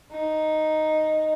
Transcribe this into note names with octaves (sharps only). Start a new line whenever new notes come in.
D#4